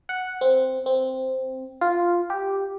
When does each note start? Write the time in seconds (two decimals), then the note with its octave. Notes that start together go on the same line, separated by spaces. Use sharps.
0.09 F#5
0.41 C4
0.86 C4
1.81 F4
2.30 G4